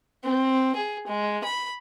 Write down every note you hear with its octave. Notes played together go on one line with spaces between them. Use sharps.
C4
G#4
G#3
B5